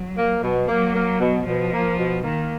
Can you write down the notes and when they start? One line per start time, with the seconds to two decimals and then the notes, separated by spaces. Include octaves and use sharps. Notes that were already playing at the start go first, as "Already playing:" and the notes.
Already playing: F#3
0.17 A#3
0.42 B2
0.68 F#3 A#3
0.95 A#3
1.20 B2
1.46 B2 F3
1.72 A#3
1.98 B2
2.23 D#3 A#3